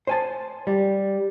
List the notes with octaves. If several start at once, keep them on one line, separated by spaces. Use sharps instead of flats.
C5 G#5 A5
G3